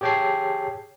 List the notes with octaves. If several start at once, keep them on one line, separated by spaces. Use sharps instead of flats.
G4 G#4 C#5 G5 A5 C7